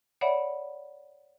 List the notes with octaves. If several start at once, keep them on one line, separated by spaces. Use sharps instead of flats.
C#5 D5 E5 F#5 B5